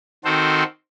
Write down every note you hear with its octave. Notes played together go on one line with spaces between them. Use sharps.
D#3 C4 F#4 A4 C5